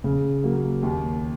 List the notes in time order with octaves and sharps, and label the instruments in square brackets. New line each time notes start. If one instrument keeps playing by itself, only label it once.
[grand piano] C#3
F#3 A#3
D#2